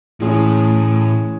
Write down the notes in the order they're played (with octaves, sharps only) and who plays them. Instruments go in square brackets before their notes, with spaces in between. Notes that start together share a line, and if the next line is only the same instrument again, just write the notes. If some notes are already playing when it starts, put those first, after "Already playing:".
[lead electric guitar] A2 [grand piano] E3 G#3 C#4 G#4